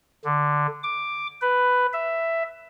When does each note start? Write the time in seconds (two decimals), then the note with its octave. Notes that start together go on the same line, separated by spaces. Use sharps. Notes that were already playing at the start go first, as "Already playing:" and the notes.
0.25 D3
0.83 D6
1.41 B4
1.93 E5